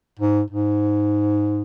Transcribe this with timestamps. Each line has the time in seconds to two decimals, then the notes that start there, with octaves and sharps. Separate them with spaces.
0.19 G#2
0.50 G#2